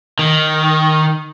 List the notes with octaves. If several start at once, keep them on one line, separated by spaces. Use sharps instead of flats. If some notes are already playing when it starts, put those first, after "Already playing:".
D#3